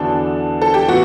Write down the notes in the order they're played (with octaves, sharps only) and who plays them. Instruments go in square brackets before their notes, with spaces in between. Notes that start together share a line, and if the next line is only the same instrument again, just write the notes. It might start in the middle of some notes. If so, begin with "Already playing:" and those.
Already playing: [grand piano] E2 D3 F#3 B3 D4 [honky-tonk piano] A4
[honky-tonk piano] A4
G4
[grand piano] A2 E3 B3 [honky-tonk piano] F#4